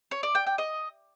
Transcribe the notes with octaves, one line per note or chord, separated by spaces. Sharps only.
C#5
D5
G5
G5
D#5